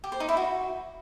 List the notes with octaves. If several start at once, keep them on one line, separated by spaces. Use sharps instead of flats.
G4
C5
D#4
E4
F#4